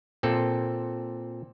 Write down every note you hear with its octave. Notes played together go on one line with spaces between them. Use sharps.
A#2 C4 A4